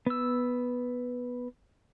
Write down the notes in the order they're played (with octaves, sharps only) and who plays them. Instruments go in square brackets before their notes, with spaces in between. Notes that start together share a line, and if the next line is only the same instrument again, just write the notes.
[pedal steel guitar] B3 E6